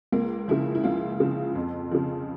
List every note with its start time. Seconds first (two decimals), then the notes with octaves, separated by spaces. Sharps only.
0.12 C#2 A#3
0.48 C#3 F3 E4
0.75 E4
0.84 C#2 F4
1.20 C#3 F3
1.55 F2
1.91 C#3 F3